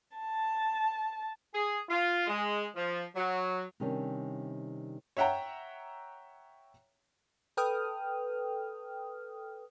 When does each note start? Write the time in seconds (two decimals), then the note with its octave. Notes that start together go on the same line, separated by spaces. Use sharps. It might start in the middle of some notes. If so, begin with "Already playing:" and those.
0.17 A5
1.53 G#4
1.89 F4
2.27 G#3
2.75 F3
3.15 F#3
3.80 C3 D#3 G3 C#4 D4
5.17 C#5 E5 F#5 G5 A#5
7.57 A4 B4 G5 D#6 F6